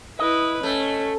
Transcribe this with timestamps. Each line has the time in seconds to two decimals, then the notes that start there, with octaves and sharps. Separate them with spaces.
0.19 E4 B4 D#5
0.63 A3 C#4